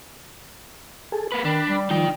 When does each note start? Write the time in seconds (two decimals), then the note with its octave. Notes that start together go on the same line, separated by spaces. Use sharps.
1.12 G#4 A4
1.32 A#3 B4 B5
1.45 D#3 D4
1.69 G3
1.90 D#3 F3 G3 D#4 G5